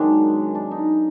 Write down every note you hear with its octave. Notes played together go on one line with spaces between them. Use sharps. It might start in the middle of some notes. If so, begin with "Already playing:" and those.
Already playing: F#2 D#3 G#3 B3 D4
D4
D#4